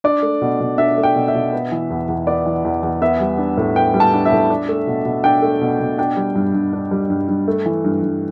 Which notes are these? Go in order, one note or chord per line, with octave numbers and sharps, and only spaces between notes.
D4 D5
A3
B2
B2
D4 E5
A3
G5
B2
E5
B2
B3
E3
E2
E2
B3 D5
E3
E2
E2
B3 E5
G3
D4
A2
B3 G5
G3
A5
D4
E5
A2
D4
A3
B2
B2
D4 G5
A3
B2
B2
D4 G5
G3
G2
G2
D4
G3
G2
G2
A3
E3
G2
G2